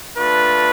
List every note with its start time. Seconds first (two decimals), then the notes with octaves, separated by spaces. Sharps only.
0.18 A3 D4 F4 B4